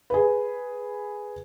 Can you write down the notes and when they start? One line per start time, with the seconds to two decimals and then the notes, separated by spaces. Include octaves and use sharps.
0.10 G#4 B4